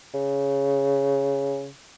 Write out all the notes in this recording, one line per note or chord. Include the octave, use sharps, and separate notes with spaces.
C#3